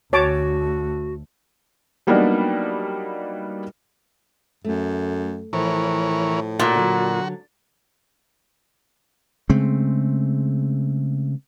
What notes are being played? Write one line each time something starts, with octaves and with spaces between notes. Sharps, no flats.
D2 A3 F#4 C#5 A5 D6
F#3 G3 A#3 B3 D4 D#4
F#2 A3
A2 E3 F3 A#4 C#5
A#2 F#4
D3 F#3
C#3 G#3 A3 C4